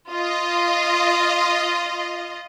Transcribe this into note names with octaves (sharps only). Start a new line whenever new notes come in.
F4 D#5